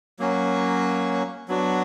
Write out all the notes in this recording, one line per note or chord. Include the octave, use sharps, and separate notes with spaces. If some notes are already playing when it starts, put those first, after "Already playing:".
F#3 A#3 C#4 F#4
F#3 B3 D4 F#4